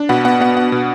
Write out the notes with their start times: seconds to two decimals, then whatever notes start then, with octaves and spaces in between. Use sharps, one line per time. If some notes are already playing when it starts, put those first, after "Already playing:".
Already playing: D4
0.09 B2 F#5 B5
0.25 B3 F#5
0.41 B3 F#5
0.56 B3 F#5
0.72 B2